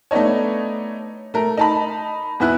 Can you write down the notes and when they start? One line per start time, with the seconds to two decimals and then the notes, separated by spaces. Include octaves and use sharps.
0.11 A3 B3 D4 D#4 C#5
1.34 A3 A#4
1.58 D#4 A5 B5
2.40 E2 B3 E4 F#6